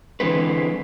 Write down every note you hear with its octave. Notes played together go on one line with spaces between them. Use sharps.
D3 E3 G#3 C4 B4